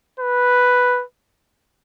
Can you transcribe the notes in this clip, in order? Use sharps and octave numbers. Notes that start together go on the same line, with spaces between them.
B4